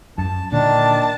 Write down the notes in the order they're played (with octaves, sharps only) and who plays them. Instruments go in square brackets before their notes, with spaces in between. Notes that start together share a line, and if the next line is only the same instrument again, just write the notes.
[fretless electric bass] F#2 [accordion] A5
[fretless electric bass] A#2 D3 [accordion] D#3 D4 [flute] D5 [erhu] A5